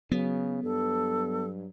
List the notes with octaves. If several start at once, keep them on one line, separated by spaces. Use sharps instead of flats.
C#3 F#3 B3
G2 A4